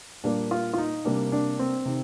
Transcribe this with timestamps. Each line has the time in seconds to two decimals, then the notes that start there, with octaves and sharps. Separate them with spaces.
0.24 A#2 G3 A#3 D4
0.51 F4
0.73 F4
0.78 D#4
1.05 C3 G3 A#3 D4
1.32 D4
1.59 C4
1.85 C3 D#3